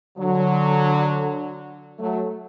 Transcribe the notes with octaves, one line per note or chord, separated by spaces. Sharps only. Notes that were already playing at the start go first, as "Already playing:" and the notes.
D3 F#3
F#3 A3